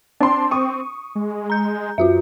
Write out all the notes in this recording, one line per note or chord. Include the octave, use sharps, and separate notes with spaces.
C4 D4 C6
C#6 D#6
G#3
A#5 G6
F#2 F4 F#4 E5